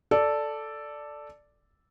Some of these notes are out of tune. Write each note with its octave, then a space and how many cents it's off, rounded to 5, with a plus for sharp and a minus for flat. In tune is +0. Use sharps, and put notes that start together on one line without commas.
A4 +0 D5 +0